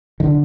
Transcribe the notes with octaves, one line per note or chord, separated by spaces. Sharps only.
D#3
D3